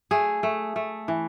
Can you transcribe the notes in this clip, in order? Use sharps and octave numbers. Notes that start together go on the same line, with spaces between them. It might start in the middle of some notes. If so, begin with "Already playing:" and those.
A3 G#4
A3
A3
E3